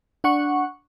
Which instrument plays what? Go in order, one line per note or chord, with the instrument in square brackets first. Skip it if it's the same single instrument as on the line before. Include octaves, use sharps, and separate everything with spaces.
[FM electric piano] D4 F#5 C#6